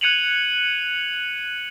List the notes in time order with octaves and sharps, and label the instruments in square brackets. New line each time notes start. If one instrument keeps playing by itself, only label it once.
[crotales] F#6 G#6 C#7 D#7 F7 F#7